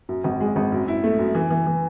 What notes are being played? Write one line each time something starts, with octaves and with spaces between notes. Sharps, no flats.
F#2
G#1
G#3
G#1
F#2
E4
A3
F#2
E3
E3
E3